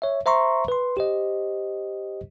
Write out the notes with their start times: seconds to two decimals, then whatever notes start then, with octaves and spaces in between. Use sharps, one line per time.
0.02 C#5 E5
0.26 C5 E5 A#5 C6 C#6
0.68 B4 C6
0.97 G4 C5 D#5